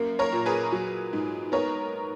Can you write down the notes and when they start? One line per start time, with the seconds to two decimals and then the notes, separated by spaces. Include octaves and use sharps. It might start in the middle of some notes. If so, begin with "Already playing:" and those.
Already playing: F#2 A#3
0.19 A#4 C#5
0.32 A#2
0.46 G#4 B4
0.72 F#3
1.13 G#2
1.52 B3 A#4 C#5